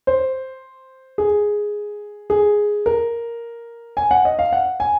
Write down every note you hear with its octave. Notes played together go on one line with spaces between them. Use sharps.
C5
G#4
G#4
A#4
G#5
F#5
D#5
F5
F#5
G#5